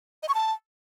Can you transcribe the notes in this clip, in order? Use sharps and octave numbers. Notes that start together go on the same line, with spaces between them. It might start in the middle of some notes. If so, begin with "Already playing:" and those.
D#5
C#6
A5